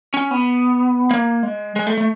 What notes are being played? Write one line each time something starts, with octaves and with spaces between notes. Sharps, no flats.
C#4
B3
A#3
G#3
G#3
A3
A3